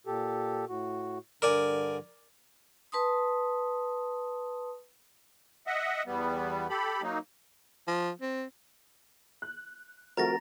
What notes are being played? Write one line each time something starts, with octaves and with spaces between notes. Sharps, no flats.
A#2 G4 A4
A2 F#4
G2 D3 A#4 D5 G#5
B4 A5 C6 D#6
D#5 E5 F#5
E2 G3 B3
G4 A4 B5
F#3 A#3 D#4
F3
C4
F#6
F3 A3 C4 F#4 A#4 A#5 A6 A#6